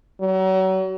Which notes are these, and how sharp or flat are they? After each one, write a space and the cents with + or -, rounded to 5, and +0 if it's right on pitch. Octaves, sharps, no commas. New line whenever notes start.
F#3 +35